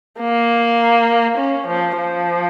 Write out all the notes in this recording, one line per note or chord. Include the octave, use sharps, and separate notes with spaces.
A#3
C#4
F3
F3